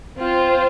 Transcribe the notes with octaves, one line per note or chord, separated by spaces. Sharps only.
C4 F4 C5